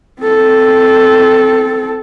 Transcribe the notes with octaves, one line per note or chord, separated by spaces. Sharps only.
C4 A4